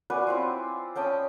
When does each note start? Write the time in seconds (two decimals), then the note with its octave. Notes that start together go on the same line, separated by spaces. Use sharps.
0.10 F#4 B4 D5 G#5
0.27 C4 E4 F4
0.96 C#4 G5 A5 D#6